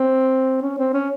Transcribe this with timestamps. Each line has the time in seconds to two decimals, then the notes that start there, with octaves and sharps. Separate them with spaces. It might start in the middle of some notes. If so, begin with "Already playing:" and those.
Already playing: C4
0.62 C#4
0.78 C4
0.93 C#4